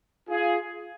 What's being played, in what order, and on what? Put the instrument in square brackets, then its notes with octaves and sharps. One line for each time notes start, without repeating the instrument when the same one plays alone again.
[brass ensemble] F4 G#4